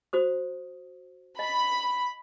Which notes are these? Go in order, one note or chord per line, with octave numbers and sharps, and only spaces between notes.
F#4 C5 D#6
D#5 B5